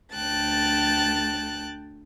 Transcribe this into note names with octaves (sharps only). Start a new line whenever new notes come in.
D2 G5 A5 F#6 A6